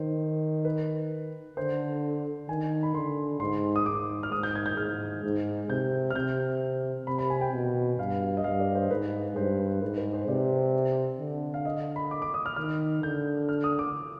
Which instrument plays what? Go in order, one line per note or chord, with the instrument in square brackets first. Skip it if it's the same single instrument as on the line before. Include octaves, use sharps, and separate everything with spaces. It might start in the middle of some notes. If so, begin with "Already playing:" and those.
Already playing: [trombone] D#3 [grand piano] C5
[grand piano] B4
[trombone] D3 [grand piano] C5
[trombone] D#3 [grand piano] G#5
[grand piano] B5
[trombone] D3 [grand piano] C6
[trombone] G#2 [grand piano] C6
[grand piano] D#6
[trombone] G#2 [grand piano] D6
[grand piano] F6
[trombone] G#2 [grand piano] D#6
[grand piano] G6
G#6
G6
[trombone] G#2 [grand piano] F6
[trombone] G#2
[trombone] C3 [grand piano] G6
[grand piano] F6
[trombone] C3 [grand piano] G6
[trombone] C3 [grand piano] B5
[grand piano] B5
G#5
G5
[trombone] B2
[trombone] G2 [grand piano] F5
[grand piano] D#5
[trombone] G2 [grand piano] F5
[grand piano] D5
C5
[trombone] G#2 [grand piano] B4
[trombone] G2 [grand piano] C5
[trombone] G#2 [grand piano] B4
[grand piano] B4
C5
[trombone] C3 [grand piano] D5
[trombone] D3
[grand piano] F5
D#5
B5
D6
D6
D#6
F6
[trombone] D#3 [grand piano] F6
[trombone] D3 [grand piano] G6
[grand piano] F6
D#6
D6